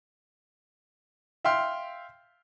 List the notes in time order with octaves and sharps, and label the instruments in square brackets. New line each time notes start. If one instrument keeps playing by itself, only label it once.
[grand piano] E5 F5 G5 C6 F6